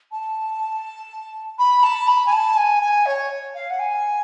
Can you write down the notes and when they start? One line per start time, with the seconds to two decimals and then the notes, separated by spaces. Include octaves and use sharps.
0.11 A5
1.58 B5
1.83 A5
2.07 B5
2.26 G#5
2.31 A5
2.56 G#5
2.81 G#5
3.05 C#5
3.54 F5
3.70 F#5
3.79 G#5